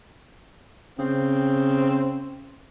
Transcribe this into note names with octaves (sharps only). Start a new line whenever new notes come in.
C#3 C4